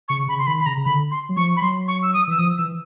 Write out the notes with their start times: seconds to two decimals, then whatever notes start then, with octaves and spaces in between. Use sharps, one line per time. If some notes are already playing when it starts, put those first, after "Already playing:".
0.08 C#3 C#6
0.28 C#3 B5
0.39 C6
0.47 D#3 B5
0.60 B5
0.66 C#3 A#5
0.77 C#3
0.85 D3 B5
1.11 C6
1.29 F#3
1.37 F3 C#6
1.56 B5
1.62 F#3 C6
1.88 C#6
2.03 E6
2.14 D#6
2.27 E3 E6
2.38 F3 D#6
2.58 E3 E6